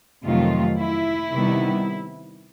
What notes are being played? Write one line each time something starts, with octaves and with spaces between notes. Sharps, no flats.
F2 C3 D#3 F#3 A3 F4
E4
C3 D#3 G3 B3